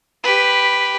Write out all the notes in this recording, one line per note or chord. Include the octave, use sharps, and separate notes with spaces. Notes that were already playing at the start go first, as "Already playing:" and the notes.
G4 B4